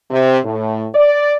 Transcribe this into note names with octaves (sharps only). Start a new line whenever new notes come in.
C3
A2
D5